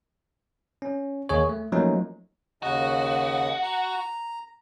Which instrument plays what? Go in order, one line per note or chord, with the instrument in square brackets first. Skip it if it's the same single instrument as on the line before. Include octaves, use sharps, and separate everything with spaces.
[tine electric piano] C#4
D#2 G#4 C#5
A3
F3 F#3 A3 A#3 C#4 D#4
[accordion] D#2 C#3 D#5 [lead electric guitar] F#4
[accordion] A#5